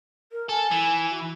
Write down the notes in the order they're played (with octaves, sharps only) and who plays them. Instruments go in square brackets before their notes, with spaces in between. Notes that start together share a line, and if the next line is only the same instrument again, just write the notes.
[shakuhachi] A#4
[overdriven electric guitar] A4 [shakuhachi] G#5
[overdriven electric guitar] E3
[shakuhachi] F#4